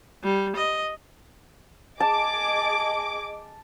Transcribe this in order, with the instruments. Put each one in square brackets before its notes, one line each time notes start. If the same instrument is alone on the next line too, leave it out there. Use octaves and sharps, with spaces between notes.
[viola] G3
D#5
[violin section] G#4 D#5 D6 [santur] A5